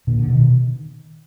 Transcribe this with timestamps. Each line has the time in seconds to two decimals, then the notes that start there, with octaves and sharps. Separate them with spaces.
0.07 A#2 D3
0.19 D3
0.30 B2 D#3